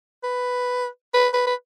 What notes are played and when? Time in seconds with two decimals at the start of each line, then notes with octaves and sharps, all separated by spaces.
0.23 B4
1.14 B4
1.34 B4
1.47 B4